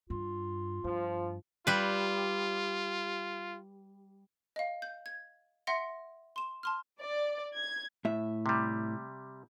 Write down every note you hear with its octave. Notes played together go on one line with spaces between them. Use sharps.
G2 F4
G2 F3
G3 F4 B4
D#5 F5
G6
G#6
E5 F#5 C6 A#6 C#7
C6 E7
A5 C6 F6
D5
G#6
A2 E5
C3 G3